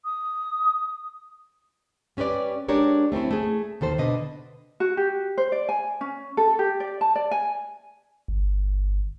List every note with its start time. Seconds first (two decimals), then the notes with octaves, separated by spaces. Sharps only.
0.05 D#6
2.17 G3 C#4 G4 B4 D5
2.68 G#3 D4 G4 A#4 C#5 D5
3.12 A3 C4 C#4 E4
3.31 A3 G#4
3.81 D#2 D#3 A4 C5
3.98 B2 D3 B4 D#5
4.80 F#4
4.97 G4
5.38 C5
5.52 D5
5.69 G#5
6.01 C#4
6.37 A4
6.59 G4
6.80 D5
7.01 A5
7.16 D5
7.31 G#5
8.28 G1